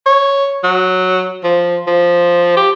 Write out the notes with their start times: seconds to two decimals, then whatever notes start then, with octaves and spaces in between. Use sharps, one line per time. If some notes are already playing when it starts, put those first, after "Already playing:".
0.06 C#5
0.64 F#3
1.44 F3
1.87 F3
2.57 G4